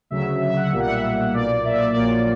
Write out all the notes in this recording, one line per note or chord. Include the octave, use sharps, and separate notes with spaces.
D2 C#3 F#3 E5
E5
F#5
B1 A#2 G3 A#3 E5
F#5
E5
B1 A#2 A#3 D5
E5
D5
A#1 A#2 F#3 A#3 D5